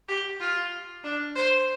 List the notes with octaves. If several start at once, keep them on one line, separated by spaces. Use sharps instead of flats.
G4
F4
D4
C5